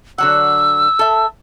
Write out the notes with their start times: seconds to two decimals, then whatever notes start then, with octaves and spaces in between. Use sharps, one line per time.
0.18 D3 F#3 F#5 E6
0.99 A4 E5